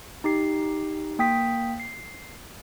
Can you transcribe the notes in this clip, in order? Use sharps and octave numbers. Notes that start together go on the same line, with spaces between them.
D#4 G4 C7
A#3 G5 D#6 B6
C7